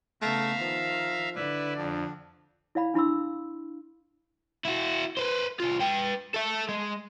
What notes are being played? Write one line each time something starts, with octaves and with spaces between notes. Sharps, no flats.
C#3 A3 B3 E5 F5 A#5
D#3 F3
D3 E4 B4 D5
F2 D4
E4 D5 F5 B5
D4 E4 B5 C6 E6
E4 F#4
B4 C5
C2 F4
B4 G5
A4 E5
G#3